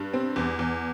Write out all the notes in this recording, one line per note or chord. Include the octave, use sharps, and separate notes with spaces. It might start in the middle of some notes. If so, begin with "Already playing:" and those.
Already playing: G2
C4
E2
E2